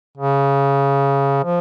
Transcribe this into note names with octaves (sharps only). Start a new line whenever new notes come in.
C#3
F3